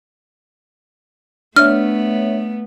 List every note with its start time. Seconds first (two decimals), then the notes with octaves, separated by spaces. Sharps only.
1.56 A3 B3 D4 C#5 E5 F6